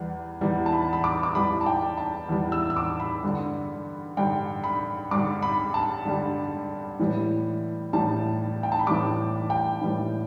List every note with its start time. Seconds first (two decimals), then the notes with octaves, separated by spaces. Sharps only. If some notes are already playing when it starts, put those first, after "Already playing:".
Already playing: E2 E3 G3
0.41 E2 E3 G3
0.66 A5
0.73 B5
0.93 B5
1.04 D6
1.23 D6
1.35 E2 E3 G3 B5
1.61 A5
1.66 G5
1.97 A5
2.29 E2 E3 G3
2.52 E6
2.70 E6
2.77 D6
3.00 B5
3.23 G2 D3 G3
4.17 G2 D3 G3 G5
4.64 B5
5.11 G2 D3 G3 D6
5.42 B5
5.74 A5
6.05 G2 D3 G3
6.99 A2 E3 G3
7.93 A2 E3 G3 A5
8.63 G5
8.72 A5
8.79 B5
8.87 A2 E3 G3 D6
9.50 G5
9.81 A2 E3 G3